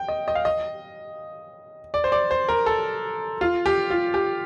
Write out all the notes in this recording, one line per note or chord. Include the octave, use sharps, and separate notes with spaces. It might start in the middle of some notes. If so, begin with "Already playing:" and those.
Already playing: G5
D#5
D#5
F5
D#5
D5
C5
D5
C5
A#4
A4
F4
G4
F4
G4